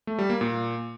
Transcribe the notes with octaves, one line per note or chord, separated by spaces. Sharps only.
A3
G3
A#3
A#2